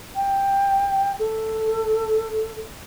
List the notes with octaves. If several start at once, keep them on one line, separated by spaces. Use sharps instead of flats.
G5
A4